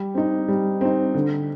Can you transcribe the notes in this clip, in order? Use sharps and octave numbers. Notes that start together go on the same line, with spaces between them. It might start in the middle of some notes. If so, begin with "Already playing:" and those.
Already playing: G3
C4 D#4
G3
C4 D#4
D3